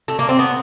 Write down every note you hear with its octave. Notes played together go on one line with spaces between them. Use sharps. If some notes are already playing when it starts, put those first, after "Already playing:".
A3
A#3
C4
B3